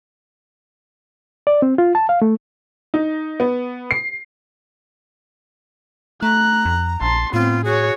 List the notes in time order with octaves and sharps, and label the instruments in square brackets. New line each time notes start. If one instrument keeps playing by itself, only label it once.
[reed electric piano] D5
C4
F4
A5
F5
A3
[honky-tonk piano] D#4
B3
C7
[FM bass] A3 [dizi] A#5 [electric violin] F#6
[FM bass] F2
[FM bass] A#1 [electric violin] A5 C6
[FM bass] A2 [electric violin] B3 C4 [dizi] F4
[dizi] F#4 [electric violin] G#4 C#5